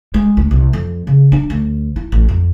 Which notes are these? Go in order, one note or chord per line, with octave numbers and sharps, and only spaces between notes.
G#3
D2
C2
F2
C#3
D4
D2
E4
A1
F2